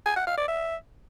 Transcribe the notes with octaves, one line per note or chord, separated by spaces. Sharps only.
G#5
F#5
F5
D5
E5